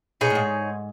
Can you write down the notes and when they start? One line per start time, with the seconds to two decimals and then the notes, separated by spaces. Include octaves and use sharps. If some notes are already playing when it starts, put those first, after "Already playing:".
0.21 B2 D#4 G#4 C#5
0.30 A2
0.35 G#2